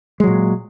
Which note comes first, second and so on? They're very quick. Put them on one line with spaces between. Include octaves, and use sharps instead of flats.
G#3 F#3 A#2